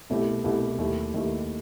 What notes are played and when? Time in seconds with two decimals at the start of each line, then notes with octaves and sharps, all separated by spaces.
0.10 C2 B2 A3 E4 G4
0.44 C2 B2 A3 E4 G4
0.78 D#2 D#3 A3 E4 G4
1.14 D#2 D#3 A3 E4 G4